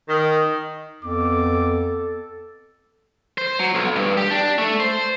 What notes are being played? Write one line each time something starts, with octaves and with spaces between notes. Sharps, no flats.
D#3
F2 B3 A4 D6
C5
F#3
B1
G2
G4
D4
A3
C5